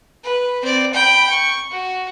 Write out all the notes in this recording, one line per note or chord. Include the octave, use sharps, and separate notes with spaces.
B4
C4 D5
G5 B5
C#6
F#4